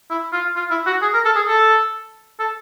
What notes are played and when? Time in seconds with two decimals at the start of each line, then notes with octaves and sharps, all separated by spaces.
0.10 E4
0.33 F4
0.56 F4
0.71 E4
0.87 F#4
1.02 G#4
1.14 A#4
1.25 A4
1.36 G#4
1.48 A4
2.40 A4